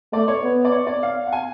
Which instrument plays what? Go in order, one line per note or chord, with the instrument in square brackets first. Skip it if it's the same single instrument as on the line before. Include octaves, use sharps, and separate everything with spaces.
[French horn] A3 [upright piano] D5
[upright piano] C#5
[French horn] B3
[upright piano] D5
C#5
D5
F5
F#5
G#5